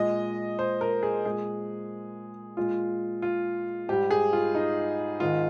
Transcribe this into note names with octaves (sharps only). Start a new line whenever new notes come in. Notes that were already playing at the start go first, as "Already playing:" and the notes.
Already playing: A#2 G#3 D#5
C5
A#4
G#4
A#2 G#3 G#4
A#2 G#3 F4
F4
G#2 G3 G4
G#4
F4
D#4
G#2 D#3 G#3 F4